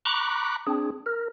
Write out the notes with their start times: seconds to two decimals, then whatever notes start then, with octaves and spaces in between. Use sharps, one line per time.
0.05 A#5 B5 C#6 D6 F#6
0.67 C4 D4 G#4
1.06 A#4